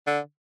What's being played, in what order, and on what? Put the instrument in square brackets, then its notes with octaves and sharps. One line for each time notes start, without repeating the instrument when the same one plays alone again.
[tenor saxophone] D3